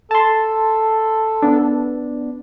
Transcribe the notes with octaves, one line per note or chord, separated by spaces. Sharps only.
A4 A5 C6
B3 D4